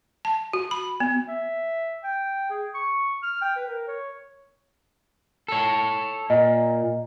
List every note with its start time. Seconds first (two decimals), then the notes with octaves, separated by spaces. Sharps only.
0.25 A5
0.53 F#4
0.71 B5
1.00 B3
1.28 E5
2.04 G5
2.50 G#4
2.74 C#6
3.23 F6
3.42 G5
3.56 B4
3.68 A#4
3.87 C#5
5.48 A4 C#5
6.30 A#2 D#5